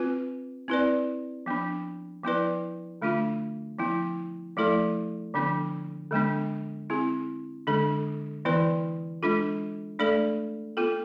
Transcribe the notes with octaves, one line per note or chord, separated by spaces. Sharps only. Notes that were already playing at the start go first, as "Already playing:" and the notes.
Already playing: C4 F4 B4
C4 E4 B4 D5
F3 B3 D4
F3 B3 E4 B4 D5
D3 A3 D4 F4
F3 B3 E4
F3 A3 E4 A4 D5
D3 F3 B3 D4
D3 G#3 B3 D4
C4 E4 G#4
D3 G#3 D4 A4
E3 B3 E4 B4 D5
G#3 D4 F4 A4
A3 D4 A4 D5
B3 F4 A4